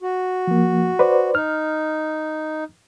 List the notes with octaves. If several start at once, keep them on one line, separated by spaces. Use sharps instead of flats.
F#4
F3 A#3
B4 C5 D5
D#4 F6